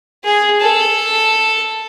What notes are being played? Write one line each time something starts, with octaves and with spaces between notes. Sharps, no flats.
G#4
A4